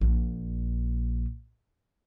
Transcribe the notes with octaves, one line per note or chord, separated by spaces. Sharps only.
A#1 A#2